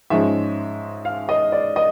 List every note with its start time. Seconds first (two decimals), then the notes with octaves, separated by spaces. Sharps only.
0.10 G#2 F3 G#3 C#4 E5
1.05 F5
1.29 D#5
1.52 D5
1.76 D#5